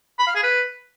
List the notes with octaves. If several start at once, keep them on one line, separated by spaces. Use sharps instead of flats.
B5
F5
G#4
B4